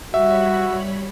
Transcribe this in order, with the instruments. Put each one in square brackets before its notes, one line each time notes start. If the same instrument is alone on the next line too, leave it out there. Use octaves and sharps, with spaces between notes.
[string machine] G3 C#5 B5 [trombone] F#4 [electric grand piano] E5